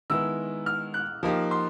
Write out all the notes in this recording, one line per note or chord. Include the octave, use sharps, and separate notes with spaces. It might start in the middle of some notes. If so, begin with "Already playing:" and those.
D#3 G#3 B3 E4 E6
F6
F#6
F3 A#3 D#4 G4
C6